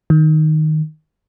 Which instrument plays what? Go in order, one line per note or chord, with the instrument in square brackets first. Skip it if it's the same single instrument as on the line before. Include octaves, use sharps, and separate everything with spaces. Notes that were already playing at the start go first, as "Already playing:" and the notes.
[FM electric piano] D#3